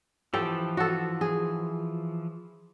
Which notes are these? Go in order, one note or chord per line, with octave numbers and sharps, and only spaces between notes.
E3 F3 G4 A4 G5
F#4 A4
G#4